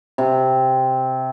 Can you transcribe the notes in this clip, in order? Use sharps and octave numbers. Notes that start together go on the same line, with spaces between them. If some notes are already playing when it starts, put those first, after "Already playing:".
C3